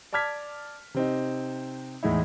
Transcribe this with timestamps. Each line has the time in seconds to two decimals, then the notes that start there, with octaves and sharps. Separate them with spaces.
0.13 D5 A5 D6 F6 G#6 B6
0.94 C3 C4 D#4
2.03 E2 A2 G#3 D#4 E4